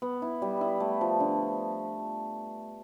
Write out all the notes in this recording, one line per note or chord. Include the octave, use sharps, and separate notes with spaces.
B3
E4
G3
E4
A3
F3
D3